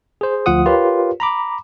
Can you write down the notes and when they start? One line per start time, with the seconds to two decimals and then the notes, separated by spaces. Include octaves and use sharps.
0.21 G#4 C5
0.46 D2 F3 F4 F#5 D#6
0.66 F4 G4 A#4 B4 C#5
1.20 A#5 B5 D6